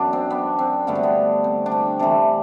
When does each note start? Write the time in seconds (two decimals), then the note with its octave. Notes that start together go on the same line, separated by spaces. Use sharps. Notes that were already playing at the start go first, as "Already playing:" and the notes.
Already playing: F#2 F#3 B3 D4
0.13 C4
0.30 B3
0.59 C4
0.87 G2 D3 A3 B3
0.95 C4
1.03 B3
1.44 C4
1.66 D4
1.72 C4
1.99 C3 E3 A3 D4